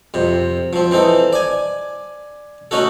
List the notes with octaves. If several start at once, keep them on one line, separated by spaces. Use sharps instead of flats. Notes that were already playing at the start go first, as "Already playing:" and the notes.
F2 C3
F3 C4
E3 C4 D#4 A4
D5 G#5
A3 C#4 D#4 F#4 A4